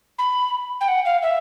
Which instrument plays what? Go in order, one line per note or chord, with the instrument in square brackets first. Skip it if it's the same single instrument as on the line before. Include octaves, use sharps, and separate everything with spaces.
[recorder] B5
G5
F#5
F5
E5